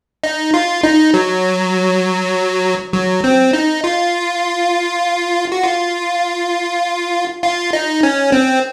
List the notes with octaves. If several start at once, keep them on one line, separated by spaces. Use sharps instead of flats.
D#4
F4
D#4
F#3
F#3
C4
D#4
F4
F#4
F4
F4
D#4
C#4
C4